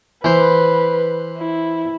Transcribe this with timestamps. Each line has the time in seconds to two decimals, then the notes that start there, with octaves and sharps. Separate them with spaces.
0.24 E3 B4 C5
1.38 E4